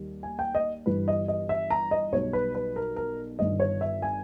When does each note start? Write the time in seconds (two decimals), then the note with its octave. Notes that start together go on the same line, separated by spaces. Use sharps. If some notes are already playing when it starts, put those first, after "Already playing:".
Already playing: D#2 D#3 G3
0.23 G#5
0.39 G5
0.55 D#5
0.86 G1 G2 E3 G3 B4
1.08 D#5
1.28 D#5
1.49 E5
1.70 A#5
1.91 D#5
2.12 B1 B2 G3 C#5
2.33 B4
2.55 B4
2.76 A#4
2.96 A#4
3.39 G1 G2 D#3 D#5
3.60 C#5
3.81 E5
4.02 G#5